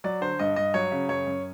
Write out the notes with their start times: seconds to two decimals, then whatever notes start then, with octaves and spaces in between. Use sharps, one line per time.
0.04 F#3 D5
0.21 D3 C5
0.39 G2 D#5
0.56 G2 D#5
0.74 F#3 C#5
0.92 C#3
1.09 F#2 C#5
1.27 F#2